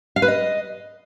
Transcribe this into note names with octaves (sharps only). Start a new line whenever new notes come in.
F5
B4
D#5